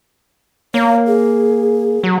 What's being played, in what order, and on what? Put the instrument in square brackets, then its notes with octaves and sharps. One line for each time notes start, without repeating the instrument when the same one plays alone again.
[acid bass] A#3 [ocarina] C#5
[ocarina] G#4
[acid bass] F#3